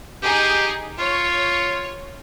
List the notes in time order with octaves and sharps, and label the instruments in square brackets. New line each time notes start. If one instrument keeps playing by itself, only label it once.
[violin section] D#4 G#4 [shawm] G4
[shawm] F4 [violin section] C#5